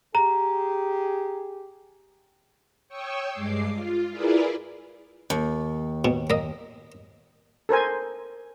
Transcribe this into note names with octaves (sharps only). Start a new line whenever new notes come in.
G4 G#4 A#5
C#5 G5 C#6 D#6 E6
G2 G#3 D6 C7
F4
E4 F4 G#4 A#4 B4 D5
D#2
B2
A#3 D#5
A4 A#4 C5 G#5